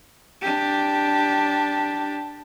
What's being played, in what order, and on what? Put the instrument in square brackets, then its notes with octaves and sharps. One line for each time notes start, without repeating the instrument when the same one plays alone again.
[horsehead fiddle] D4 G4